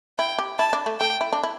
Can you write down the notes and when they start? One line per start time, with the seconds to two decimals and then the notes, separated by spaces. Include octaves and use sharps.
0.18 E4 G5
0.38 G4
0.58 E4 A5
0.73 D4
0.86 A3
1.00 A3 G5
1.21 E4
1.33 D4
1.43 E4